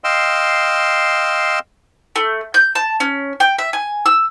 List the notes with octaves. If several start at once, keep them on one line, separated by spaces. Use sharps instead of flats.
D#5 F5 G5 C6 E6
A3
G6
A5
C#4
G5
E5
G#5
E6